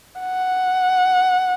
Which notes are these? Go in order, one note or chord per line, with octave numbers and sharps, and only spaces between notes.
F#5